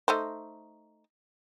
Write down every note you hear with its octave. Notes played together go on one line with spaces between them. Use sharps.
A3 D#4 C5